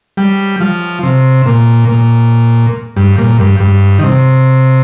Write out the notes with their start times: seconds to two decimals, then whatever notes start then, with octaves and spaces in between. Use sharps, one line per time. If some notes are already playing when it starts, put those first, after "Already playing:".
0.17 G3
0.60 F3
1.03 C3
1.46 A#2
1.89 A#2
2.96 G2
3.18 A#2
3.39 G2
3.60 G2
3.99 D#3
4.04 C3